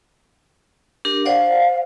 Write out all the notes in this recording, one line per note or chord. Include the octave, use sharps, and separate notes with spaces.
D4 G4 A#4
C5 D5 F5 F#5